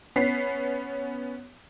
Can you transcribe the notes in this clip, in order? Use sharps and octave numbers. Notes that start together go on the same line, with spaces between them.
B3 C#4 B6 C7